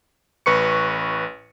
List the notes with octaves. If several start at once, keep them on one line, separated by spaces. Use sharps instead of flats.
A1 B4 C#6 C#7